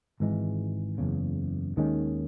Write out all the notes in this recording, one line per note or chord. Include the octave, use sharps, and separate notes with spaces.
G#1 G#2 E3 G#3
F#1 E2 C#3
D#2 D#3 G#3 C#4